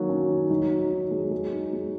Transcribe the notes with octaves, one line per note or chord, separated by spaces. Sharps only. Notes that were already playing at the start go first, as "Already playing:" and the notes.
Already playing: D#3 F#3 A#3
C#4
D#3
F#3 D#4
D#4
D#3
G#3
G#3
D#4
G#3